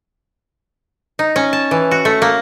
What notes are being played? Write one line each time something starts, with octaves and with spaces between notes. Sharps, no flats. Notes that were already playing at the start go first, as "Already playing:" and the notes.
D#4
C#4
A5
E3
F#4
A3
A#3